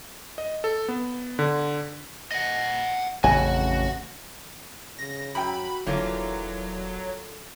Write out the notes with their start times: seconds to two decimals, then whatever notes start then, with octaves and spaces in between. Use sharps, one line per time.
0.38 D#5
0.64 A4
0.88 B3
1.39 D3
2.32 D#5 F#5
3.24 A1 F2 C#3 F#4 G#5
4.99 C#3 A#6
5.35 F#2 F#4 G5 B5
5.87 E1 D3 E3 F#3 A#3 F4